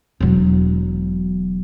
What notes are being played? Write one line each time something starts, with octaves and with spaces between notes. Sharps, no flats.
E1 F#3